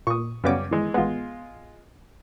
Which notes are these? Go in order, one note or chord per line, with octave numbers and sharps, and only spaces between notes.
A#2 C#6 D#6
F#2 C#3 G3 B3 C#4 D6
E3 G#3
A1 G#3 B3 F4